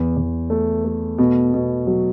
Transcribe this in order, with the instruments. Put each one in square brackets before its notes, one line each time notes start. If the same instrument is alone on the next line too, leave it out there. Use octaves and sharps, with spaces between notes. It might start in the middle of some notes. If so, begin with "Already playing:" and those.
Already playing: [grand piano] E2
E2
A3
A3
B2
B2
F#3